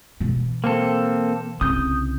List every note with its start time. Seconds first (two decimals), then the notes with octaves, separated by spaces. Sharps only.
0.20 B2 E3
0.64 A#3 C4 A4
1.61 C2 C#3 D#6 G6